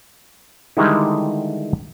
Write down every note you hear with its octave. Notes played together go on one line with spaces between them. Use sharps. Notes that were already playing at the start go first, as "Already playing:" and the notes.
D3 D#3 G3 G#3 D#4 E4